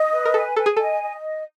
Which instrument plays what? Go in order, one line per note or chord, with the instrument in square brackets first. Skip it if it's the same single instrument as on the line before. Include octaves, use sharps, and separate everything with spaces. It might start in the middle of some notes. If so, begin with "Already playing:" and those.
Already playing: [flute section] D#5
B4
[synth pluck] A#4
[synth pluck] A4 [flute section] G#5
[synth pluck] A4 [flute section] G#5
[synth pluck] G#4
[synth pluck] A4 [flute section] D#5
[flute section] D#5